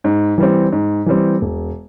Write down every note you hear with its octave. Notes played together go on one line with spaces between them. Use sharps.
G#2
E3 G3 C4
G#2
E3 G3 C4
E1